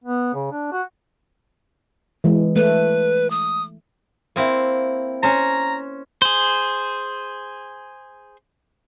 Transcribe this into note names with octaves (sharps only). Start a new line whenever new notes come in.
B3
C#3
D4
F#4
E3 G#3
A3 B4
D#6
A#3 C4 E4
C#4 C5 A#5
G#4 C5